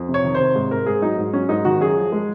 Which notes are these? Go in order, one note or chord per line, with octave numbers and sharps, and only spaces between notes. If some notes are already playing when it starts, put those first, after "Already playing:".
Already playing: F2
C3
C#5
D#3
C5
C3
G#2
G#2 A#4
G#2 G#4
F#3 D#4
G#2
F#3 C#4
G#2 D#4
D#3 F#4
F#2 G#4
F3
G#3